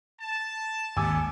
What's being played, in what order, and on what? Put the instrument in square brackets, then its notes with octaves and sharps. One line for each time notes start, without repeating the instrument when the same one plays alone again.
[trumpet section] A5
[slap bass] G#1 D#2 [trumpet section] B3 D4 A4 [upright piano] G#5 D6 E6